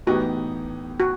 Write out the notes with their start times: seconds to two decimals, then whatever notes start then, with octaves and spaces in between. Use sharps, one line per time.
0.07 A2 E3 B3 D#4 F#4 G4
1.00 F#4